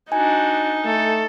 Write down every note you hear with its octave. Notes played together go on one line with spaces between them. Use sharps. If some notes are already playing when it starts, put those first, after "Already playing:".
D4 D#4 F#4 G#5
A3 A4